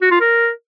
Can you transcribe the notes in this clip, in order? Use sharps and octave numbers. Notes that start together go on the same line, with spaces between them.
F#4
F4
A#4